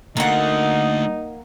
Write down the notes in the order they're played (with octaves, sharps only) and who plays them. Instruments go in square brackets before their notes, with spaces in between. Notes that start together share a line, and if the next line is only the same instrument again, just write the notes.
[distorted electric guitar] D3 A3 [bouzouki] A#3 F#5 [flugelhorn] D#4